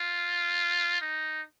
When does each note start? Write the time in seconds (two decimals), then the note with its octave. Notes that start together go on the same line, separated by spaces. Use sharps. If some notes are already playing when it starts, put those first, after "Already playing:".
Already playing: F4
1.01 D#4